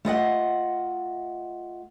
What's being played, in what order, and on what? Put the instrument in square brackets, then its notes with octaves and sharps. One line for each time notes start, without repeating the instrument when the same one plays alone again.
[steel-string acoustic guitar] A3 F4 D#5 F#5